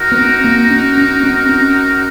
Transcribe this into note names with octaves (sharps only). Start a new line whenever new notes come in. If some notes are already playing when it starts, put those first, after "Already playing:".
Already playing: D#4 F#4 A#4
B3
C4
A#3
C#4
C#4
C4
C#4